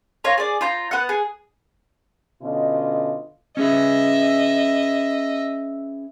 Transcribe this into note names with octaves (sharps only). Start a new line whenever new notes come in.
F4 C#5 A#5
G#4 D5
F4 C5 A#5
B3 F#5
G#4
B2 D3 C#4 F4 D#5
C#4 G#4 B4 D#5 E5